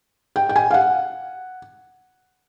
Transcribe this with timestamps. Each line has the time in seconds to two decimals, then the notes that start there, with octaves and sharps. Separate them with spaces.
0.36 G5
0.49 G5
0.56 G#5
0.71 F5
0.74 F#5